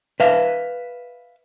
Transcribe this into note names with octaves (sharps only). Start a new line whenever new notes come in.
B4 E5 F5